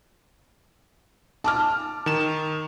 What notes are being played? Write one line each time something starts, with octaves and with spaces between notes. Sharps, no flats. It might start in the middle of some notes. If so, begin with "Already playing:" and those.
A5 D6 F6
D#3 E7